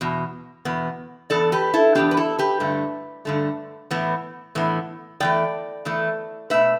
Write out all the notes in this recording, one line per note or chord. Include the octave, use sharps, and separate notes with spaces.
E2 B2
E2 B2 B3
E2 E3 B3 A4 D5
G4 B4
E4 A4
E2 E3 B3 D4 G4
B4
E4 A4
G4 B4
G2 D3 A3
G2 D3 A3
A2 E3 B3
A2 E3 B3
E2 E3 A3 D5 G5
E2 E3 A3
B2 A3 B4 E5